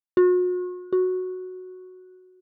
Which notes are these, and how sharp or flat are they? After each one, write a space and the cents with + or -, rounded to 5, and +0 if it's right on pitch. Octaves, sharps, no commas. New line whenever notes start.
F#4 -40
F#4 -5